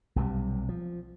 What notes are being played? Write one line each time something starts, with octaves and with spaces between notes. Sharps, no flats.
B1 C3 D#3 G3
F3